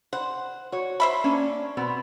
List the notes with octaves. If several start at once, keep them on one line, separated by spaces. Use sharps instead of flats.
C5 F#5
F#4 C#5
C5 E5 B5
A#3 C#4 D4
B2 B3 C4